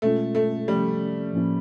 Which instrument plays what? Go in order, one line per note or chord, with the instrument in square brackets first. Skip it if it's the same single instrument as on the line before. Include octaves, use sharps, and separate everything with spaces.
[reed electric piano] B2 G#3 C#4 F4 [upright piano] A3
[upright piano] A3
[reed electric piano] C2 C3 F3 A3 C#4 [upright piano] G3
[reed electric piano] A2 F3 A#3 C#4 E4